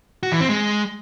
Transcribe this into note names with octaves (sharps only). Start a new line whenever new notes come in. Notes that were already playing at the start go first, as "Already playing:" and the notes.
F#4
E3
C4
G#3